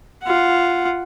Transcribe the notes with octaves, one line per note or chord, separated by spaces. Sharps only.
F4 F#5